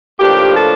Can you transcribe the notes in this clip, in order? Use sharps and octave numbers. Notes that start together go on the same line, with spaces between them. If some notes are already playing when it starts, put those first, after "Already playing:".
A2 F3 A#3 D4 G4
A4